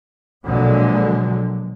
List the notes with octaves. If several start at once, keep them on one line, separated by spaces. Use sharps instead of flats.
A#1 B2 D3 F#3 G#3